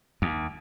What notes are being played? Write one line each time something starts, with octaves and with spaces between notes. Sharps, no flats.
D#2